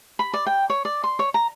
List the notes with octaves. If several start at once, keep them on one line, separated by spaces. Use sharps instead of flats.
B5
D5
G5
C#5
D5
C6
C#5
A#5